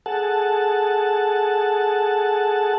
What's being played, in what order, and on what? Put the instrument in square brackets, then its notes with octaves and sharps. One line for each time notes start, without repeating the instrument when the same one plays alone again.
[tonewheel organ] G#4 A4 F#5 A5